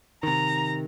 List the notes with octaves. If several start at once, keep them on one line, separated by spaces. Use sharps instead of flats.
C3 D#3 A#5